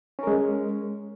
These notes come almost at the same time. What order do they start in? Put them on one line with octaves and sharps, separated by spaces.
C#4 A#4 G#3